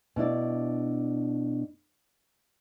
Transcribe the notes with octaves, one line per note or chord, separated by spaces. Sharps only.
B2 D4 E4 D5